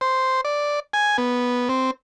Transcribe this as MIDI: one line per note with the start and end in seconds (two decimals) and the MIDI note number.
0.01 0.41 72
0.45 0.80 74
0.93 1.17 80
1.18 1.69 59
1.69 1.91 60